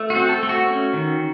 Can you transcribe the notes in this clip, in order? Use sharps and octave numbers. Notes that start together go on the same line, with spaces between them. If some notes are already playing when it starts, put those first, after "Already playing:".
Already playing: A3
F#4
C4
A4
A3
F#4
C#4
D#3